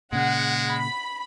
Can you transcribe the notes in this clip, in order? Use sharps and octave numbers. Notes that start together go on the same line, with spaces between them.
A#2 C#3 G#3 F#5
B5